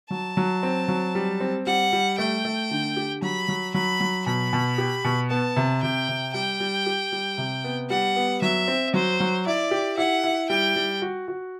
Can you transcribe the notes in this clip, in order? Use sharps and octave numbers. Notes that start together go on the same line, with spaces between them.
F#3 A5
F#3
C4
F#3
G3
C4
G3 F#5
G3
A3 G5
A3
D3
G4
F#3 B5
F#3
F#3 B5
F#3
B2 B5
B2
G4
B2
B3 A5
C3
C3 G5
C3
G3 G5
G3
G4
G3
C3
B3
G3 F#5
B3
F#3 E5
C4
F#3 C5
F#3
E4 D5
G4
E4 F#5
E4
G3 G5
G3
F#4
F#4